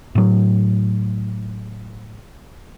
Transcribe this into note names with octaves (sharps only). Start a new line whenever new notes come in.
A2 F#3